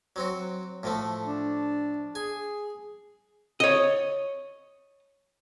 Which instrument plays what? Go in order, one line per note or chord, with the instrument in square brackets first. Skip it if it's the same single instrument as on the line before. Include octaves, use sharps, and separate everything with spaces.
[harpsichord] F#3 C4 F#4
A2 F3 A3
[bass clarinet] D4
[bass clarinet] G#4 [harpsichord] G#5
[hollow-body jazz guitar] C#5 D#5